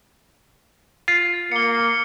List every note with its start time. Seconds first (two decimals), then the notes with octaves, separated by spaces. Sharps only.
1.08 F4
1.52 A#3 C#7 G7